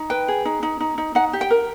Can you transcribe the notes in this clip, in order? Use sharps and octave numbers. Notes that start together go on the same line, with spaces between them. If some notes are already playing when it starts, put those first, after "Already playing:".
Already playing: D#4
B4 G5
G#4
D#4
D#4
D#4
D#4
D#4 F#5
G4
G5
A#4